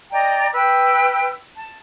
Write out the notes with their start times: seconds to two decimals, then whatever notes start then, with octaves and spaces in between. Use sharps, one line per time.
0.11 D5 D#5 G5 A#5
0.53 B4 G5 E6
1.55 A5